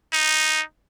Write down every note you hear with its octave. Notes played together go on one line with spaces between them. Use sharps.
D#4